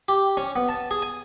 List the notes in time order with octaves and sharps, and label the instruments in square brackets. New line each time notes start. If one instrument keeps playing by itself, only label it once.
[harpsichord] G4
C#4
B3
A5
G#4
G#5